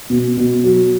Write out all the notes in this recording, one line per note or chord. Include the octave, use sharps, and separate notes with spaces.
B2
B2
F#3